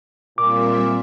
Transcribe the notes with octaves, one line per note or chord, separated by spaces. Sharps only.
A#2 G3 C4 E5 D6